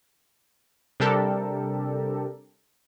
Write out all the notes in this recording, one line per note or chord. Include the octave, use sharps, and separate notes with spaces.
C3 G3 D4 G4 A4 A#4